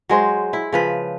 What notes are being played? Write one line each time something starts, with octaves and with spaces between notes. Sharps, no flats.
F#3 G#3 C5
E4
C#3 F3 B4